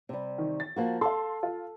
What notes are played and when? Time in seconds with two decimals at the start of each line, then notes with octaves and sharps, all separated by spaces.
0.09 C3 G3
0.38 D#3
0.60 A6
0.76 F3 A#3 F#4
1.01 A4 F5 A5 C6
1.43 F4